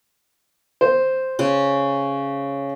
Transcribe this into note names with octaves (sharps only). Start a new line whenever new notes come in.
C5
C#3